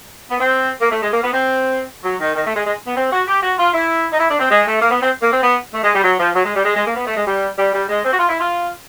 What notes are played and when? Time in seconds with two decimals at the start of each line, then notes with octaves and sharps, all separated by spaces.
0.30 B3
0.40 C4
0.81 A#3
0.91 A3
1.03 G#3
1.12 A#3
1.23 B3
1.33 C4
2.04 F#3
2.20 D#3
2.36 D#3
2.45 A3
2.56 G#3
2.66 G#3
2.87 B3
2.96 C4
3.12 F#4
3.27 G4
3.42 F#4
3.59 F4
3.74 E4
4.13 D#4
4.20 E4
4.30 D4
4.40 C4
4.51 G#3
4.66 A3
4.81 A#3
4.91 B3
5.02 C4
5.22 A#3
5.32 C4
5.43 B3
5.74 A3
5.83 G#3
5.94 G3
6.04 F#3
6.20 F3
6.35 F#3
6.45 G#3
6.55 G3
6.65 G#3
6.76 G#3
6.86 A#3
6.96 B3
7.07 A3
7.17 G#3
7.27 G3
7.58 G3
7.73 G3
7.89 G#3
8.04 C4
8.13 F#4
8.19 F4
8.29 E4
8.40 F4